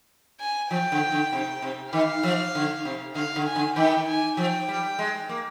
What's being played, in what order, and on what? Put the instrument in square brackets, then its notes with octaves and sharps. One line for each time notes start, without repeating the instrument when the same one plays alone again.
[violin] G#5
[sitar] F3 [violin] G5
[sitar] D3
D3
C3
C3
[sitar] D#3 [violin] F5
[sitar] F3
D3
C3
[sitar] D3 [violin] F5
[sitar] D3
[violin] G#5
[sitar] D3
[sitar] D#3 [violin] G5
[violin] G#5
[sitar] F3 [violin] G5
[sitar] G3
G#3
A#3